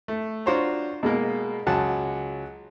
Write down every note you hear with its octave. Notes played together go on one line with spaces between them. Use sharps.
A3
D4 F4 F#4 C5 C#5 A#5
B2 G#3 A#3
C#2 F#3 F#5 A5